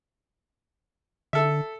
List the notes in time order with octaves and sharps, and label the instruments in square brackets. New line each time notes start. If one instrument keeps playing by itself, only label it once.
[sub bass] D3 [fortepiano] A4 E5